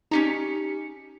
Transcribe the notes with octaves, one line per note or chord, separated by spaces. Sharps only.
C#4 D#4 G4 A#5 C#7